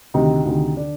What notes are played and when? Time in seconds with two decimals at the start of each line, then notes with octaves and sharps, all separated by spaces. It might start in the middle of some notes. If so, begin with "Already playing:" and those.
0.14 D2 C3 D#3 D#4
0.45 D2 C3 D#3
0.77 D3 D4